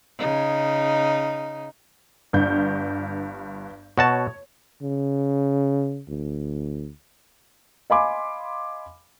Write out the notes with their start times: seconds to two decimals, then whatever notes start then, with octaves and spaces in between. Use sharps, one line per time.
0.18 C#3 D#4
2.33 G1 G2 G6
3.98 B2 F#4 C#5 A5
4.82 C#3
6.09 D2
7.90 D#5 F5 G#5 B5 C6 D6